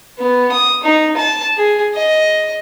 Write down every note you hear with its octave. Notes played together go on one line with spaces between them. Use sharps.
B3
D#6
D#4
A5
G#4
D#5